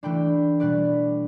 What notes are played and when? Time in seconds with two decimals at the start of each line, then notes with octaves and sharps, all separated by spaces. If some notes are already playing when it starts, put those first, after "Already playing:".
0.03 E3 A3 D4 G5 B5
0.60 B2 G3 B3 D4 B4 D5